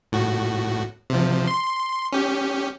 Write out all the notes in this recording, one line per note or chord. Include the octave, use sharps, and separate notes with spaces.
A2 F#4
C3 F3
C6
C#4 G4